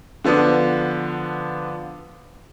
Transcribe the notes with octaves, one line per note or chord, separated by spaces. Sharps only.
D3 F3 B3 D4